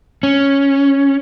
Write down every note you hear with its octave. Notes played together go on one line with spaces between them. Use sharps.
C#4